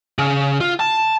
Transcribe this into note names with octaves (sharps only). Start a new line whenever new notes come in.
C#3
F4
A5